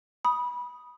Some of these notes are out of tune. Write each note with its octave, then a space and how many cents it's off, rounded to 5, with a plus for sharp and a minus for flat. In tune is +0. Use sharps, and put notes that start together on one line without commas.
B5 -20 D#6 +5